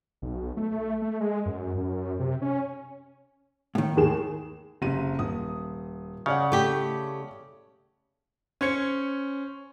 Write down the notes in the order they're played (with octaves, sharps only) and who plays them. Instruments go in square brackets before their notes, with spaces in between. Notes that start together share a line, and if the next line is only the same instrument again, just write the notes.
[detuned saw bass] B1
A3
A3
G#3
F#2
F#2
C3
C#4
[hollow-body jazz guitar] A2 D#3
[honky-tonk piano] D#2 G#4 E7
[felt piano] F#1 C3 D#7
D#1 D#6
[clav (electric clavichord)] C#3 [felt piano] C#5 D5 F#5
[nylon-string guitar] A3 G4
[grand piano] C#4 C5 G#6 C#7